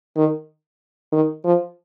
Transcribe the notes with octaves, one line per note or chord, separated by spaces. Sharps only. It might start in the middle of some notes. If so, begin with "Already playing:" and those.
D#3
D#3
F3